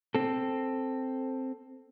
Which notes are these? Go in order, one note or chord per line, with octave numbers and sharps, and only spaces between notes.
C4 A4